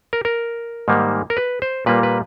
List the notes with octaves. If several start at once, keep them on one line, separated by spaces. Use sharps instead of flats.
A#4
A#4
G#2 D#3 G3 A#3
A#4
B4
C5
A#2 G3 A#3 B4
B4